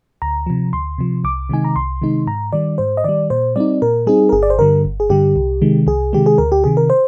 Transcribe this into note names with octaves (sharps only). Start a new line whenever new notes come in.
D2 A#5
C3 F3
D2 C6
C3 F3
C2 D6
C3 D#3 G#3 D#4 G#5
A#5
C2 C6
C3 D#3 G#3 D#4
G#2 A#5
D#3 G3 D5
G#2 C5
D#5
D#3 G3 D5
A#2 C5
G3 C4 D#4 D5
A#2 A#4
G3 C4 D#4 G#4
A#4
G1 G#4
D5
C5
G2 D3 G3 A#4
G1
G#4
G2 D3 G3 G4
C2
C3 D#3 G#3
C2 G#4
C3 D#3 G#3 G4
G#4
D2 A#4
G4
C3 D#3 G#4
A#4
C5